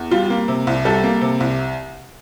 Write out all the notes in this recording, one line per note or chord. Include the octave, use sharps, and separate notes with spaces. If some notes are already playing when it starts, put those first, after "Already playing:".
Already playing: E2
G3 F4
A#3
C3
C2
G3 A4
A#3
C3
C2